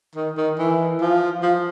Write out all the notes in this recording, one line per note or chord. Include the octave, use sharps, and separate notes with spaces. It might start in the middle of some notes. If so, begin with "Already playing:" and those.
D#3
D#3
E3
F3
F3